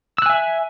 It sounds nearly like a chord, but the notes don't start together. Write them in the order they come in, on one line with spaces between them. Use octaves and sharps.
E6 F#6 G#5 E5